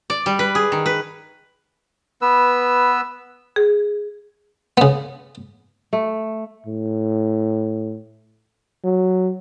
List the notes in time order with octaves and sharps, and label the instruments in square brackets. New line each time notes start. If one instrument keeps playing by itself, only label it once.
[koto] D5
G3
B4
G#4
D#3
B4
[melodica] B3 B4 E6
[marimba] G#4
[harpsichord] C#3 B3
[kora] A3
[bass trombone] A2
F#3